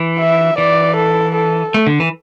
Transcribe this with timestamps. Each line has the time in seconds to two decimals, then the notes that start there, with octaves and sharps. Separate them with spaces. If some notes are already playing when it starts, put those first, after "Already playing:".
Already playing: E3
0.20 E5
0.58 E3 D5
0.97 A4
1.35 A4
1.74 A3
1.87 D3
2.00 E3